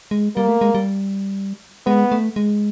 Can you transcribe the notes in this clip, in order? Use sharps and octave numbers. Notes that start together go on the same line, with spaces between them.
G#3
G3 A#3
A3
G#3
G3
G#3 B3
A3
G#3